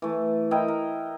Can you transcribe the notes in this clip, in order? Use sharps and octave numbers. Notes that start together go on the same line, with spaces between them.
E3 A3
E4 A#4 D#5 G5
A#4